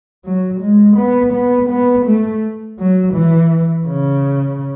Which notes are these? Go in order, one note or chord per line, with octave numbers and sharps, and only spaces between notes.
F#3
G#3
B3
B3
B3
A3
F#3
E3
C#3